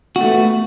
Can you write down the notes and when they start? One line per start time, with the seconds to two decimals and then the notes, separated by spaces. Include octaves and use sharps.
0.16 F#4
0.21 A3
0.26 B3